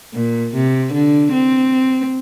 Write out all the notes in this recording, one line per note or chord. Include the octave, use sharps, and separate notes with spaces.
A#2
C3
D3
C4